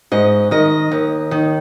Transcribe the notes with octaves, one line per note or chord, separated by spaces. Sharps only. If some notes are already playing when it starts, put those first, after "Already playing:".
G#2 D#5
D#3 D#5
D#2
D#3